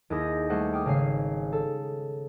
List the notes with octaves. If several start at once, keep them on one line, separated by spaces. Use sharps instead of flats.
D#2 E4 G#4 D#6 G6 A#6
G3 A3 G#4 C5 F#5
G5 D6 D#6 F6
G#1 C#3 F5 G#5 C7
A4